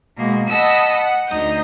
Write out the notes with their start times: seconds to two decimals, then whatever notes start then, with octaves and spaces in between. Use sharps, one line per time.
0.17 B2 G#3 A#3
0.47 D#5 F#5 A5 B5 D#6 E6
0.93 F#5
1.27 D2 D#4 D#6 G6